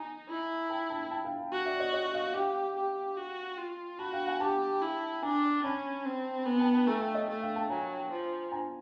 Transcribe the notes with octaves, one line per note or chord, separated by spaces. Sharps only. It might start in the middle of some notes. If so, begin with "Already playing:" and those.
Already playing: D#4 G#5 A#5
E4
G5 A5
A5 B5
G5 A5
F5 G5
F#4
D5 E5
C#5 D#5
C#5 D#5
D#5 F5
G4 F5 G5
G4
F#4
F4
F#4 A5 B5
F5 G5
F#5 G#5
G4 G5 A5
E4
D4 G#5 A#5
C#4 A5 B5
C4
B3 G#5 A#5
G5 A5
G5 A5
A3 G#5 A#5
F5 G5
C#5 D#5
A3
F5 G5
G5 A5
F#3 G#5 A#5
F3
G#5 A#5